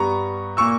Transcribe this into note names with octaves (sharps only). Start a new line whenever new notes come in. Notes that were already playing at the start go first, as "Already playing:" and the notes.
Already playing: G2 G3 B3 A#5 C#6
A#2 A#3 C#6 E6